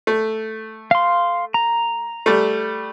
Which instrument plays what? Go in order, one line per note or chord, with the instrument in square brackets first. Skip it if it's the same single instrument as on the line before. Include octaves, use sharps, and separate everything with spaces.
[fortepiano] A3
[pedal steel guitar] F5 C6
A#5
[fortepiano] G3 A3